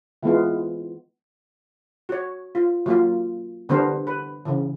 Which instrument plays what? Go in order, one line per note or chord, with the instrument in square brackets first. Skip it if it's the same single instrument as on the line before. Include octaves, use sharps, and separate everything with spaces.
[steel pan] E3 G#3 B3 F4
F#4 C#5
F4
F#3 A#3 F4
D3 G3 B3 D4 A#4 C5
B4
C#3 E3